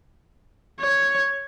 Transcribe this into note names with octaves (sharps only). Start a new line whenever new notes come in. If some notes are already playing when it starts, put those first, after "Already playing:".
C#5